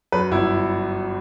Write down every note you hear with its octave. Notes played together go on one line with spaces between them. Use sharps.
F#2 B4
G1 E4